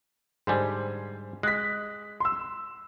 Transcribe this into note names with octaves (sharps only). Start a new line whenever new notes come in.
G#2 D3 G3 C5 G#5
G#3 F#6 B6
C6 E6